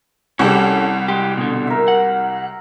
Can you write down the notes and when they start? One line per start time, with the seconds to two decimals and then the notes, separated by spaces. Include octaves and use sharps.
0.39 C2 G3 C#4 F#4 G4 A4
1.08 G#3 G4
1.37 B2 D3
1.67 A#4 E5
1.88 F#5